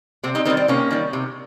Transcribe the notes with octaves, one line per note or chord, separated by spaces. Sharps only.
C3 C4
C4 D#4
D#3 G3 C4 D#4
C4
C3 A#3 C#4
D#3 G3
C3